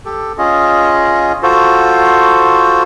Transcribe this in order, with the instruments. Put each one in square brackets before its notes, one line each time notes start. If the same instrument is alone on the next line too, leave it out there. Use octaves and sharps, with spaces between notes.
[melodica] G4 A4
C#4 F4 G#4 D#5
F4 F#4 A4 C5